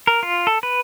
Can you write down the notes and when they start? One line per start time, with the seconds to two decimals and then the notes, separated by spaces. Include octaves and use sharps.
0.07 A#4
0.23 F4
0.47 A4
0.63 B4